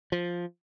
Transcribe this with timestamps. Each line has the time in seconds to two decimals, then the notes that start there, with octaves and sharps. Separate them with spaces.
0.12 F3